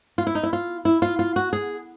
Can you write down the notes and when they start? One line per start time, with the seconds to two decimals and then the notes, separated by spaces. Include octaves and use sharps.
0.18 F4
0.27 E4
0.35 D#4
0.43 E4
0.53 F4
0.85 E4
1.02 F4
1.19 F4
1.36 F#4
1.53 G#4